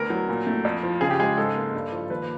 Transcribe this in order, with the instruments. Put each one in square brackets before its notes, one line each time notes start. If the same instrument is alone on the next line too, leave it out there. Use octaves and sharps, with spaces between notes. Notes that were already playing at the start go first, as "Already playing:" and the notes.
Already playing: [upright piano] D2 B3 A#4
F#3
A#2
A3
F2
F3
C#3 G#4
G4
G#3 G#4
G#2 A4
A#3
G2
F3
D#2 B4